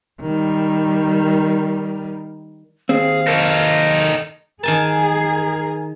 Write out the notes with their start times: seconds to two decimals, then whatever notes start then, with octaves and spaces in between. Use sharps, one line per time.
0.21 D#3 G3
2.89 D#2 C4 G#4 F5
3.27 D#4 A4 A#4
4.63 D#3 G#4 A#4 G#5 A5